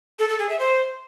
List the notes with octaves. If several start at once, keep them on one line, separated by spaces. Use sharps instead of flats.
A4
A4
G#4
E5
C5